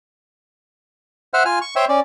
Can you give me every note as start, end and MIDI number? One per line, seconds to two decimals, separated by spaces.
1.34 1.43 72
1.34 1.43 76
1.34 1.43 78
1.34 1.43 89
1.45 1.59 65
1.45 1.59 80
1.45 1.59 89
1.61 1.75 85
1.76 1.85 72
1.76 1.85 73
1.76 1.85 76
1.76 1.85 79
1.76 1.85 84
1.89 2.00 61
1.89 2.00 74